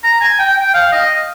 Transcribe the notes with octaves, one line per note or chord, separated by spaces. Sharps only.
A#5
G#5
G5
G5
F5
D#5